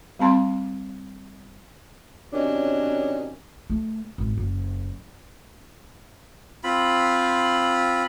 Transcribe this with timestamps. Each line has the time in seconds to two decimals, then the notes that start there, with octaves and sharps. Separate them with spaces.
0.19 G3 C4 A5 C6
2.33 C3 D#3 F#3 C#4 D4
3.70 A3
4.18 G#1
4.38 F#1
6.64 C4 F4 B5